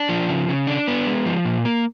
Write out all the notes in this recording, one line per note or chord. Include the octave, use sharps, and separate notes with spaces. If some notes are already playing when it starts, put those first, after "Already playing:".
Already playing: D4
F3
C#3
C#3
D4
B3
G#3
F3
A#2
A#3